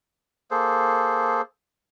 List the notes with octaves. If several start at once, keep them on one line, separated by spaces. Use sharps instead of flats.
A#3 G#4 A4 C5